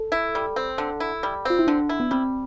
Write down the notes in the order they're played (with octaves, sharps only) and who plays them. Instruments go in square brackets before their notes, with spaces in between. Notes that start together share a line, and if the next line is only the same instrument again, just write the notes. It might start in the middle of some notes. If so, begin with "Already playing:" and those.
Already playing: [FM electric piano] A4
[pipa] E4
G3
C4
D3
E4
G3
[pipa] C4 [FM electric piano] F4
[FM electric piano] E4
[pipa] D3 [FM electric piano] D4
[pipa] E4
[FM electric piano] B3
[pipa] G3 [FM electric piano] C4